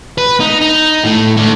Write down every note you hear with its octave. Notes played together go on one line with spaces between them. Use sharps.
B4
D#4
D#4
A2 A3
A3 D4